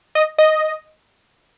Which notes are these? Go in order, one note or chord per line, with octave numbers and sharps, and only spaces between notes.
D#5
D#5